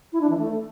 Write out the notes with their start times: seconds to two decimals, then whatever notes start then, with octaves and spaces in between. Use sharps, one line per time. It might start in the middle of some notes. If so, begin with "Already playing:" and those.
0.13 E4
0.21 D4
0.30 E3
0.38 A3